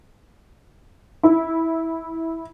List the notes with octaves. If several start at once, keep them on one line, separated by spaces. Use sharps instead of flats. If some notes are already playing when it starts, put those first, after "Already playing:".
E4